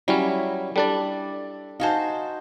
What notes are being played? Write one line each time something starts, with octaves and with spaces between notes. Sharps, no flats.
F#3 G3 C#4 E4
G3 D4 A4 D5
D#4 F#4 C5 F5 G#5 A5